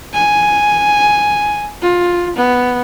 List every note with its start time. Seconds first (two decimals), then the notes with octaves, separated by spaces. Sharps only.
0.13 G#5
1.81 F4
2.36 B3